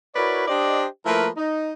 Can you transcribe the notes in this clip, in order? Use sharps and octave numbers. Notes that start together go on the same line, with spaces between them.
E4 F#4 A#4 B4 C#5 D5
D4 G4 C5 D5 D#5
F3 A3 A#3 E4 A#4 B4
D#4